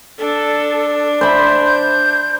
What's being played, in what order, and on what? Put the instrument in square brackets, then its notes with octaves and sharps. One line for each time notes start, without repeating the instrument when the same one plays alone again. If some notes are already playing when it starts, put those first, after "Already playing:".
[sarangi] D4 [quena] A4
[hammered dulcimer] C5 B5 [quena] E5
[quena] G6